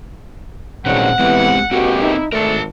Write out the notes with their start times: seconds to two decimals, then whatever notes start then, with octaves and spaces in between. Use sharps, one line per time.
0.86 G2 A#2 D#3 F#3 G#3 C4 C#4 F#5
1.19 A2 E3 G#3 B3 C4 G4
1.71 C#2 B2 C4 F#4 G4 A4 A#4
2.02 D#4 E4
2.32 G#1 A3 D4 A#4 A5